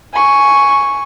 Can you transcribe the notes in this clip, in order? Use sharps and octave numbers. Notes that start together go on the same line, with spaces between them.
G#5 C#6